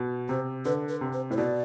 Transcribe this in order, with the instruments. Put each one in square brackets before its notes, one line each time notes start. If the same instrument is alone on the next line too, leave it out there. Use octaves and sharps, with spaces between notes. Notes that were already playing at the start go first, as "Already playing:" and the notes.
Already playing: [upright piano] B2
[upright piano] C3 [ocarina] C5
[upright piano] D3 [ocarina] B4
[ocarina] B4
[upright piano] C3
[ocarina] C5
[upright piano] A2 [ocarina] C5
[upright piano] B2 [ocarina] D5